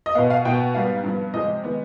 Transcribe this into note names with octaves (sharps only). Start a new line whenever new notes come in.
D#5
B2 B3 F5
F5
B2 B3 G5
G#2 G3 B3 F5
G2 F3 B3
C3 F3 G#3 D#5
D#3 G#3 B3